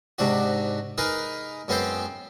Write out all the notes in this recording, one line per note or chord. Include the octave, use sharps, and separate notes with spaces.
G#2 C3 D4 F#4
D#4 G#4 A#4 B4
F#2 G#3 B3 C4 C5 G5